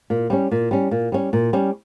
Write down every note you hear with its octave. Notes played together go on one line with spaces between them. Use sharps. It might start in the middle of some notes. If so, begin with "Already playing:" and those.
A#2
G3 C#4
A#2
G3 C#4
A#2
G3 C#4
A#2
G3 C#4